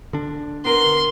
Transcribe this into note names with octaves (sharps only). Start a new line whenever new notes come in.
D3 D4
B3 A#4 C6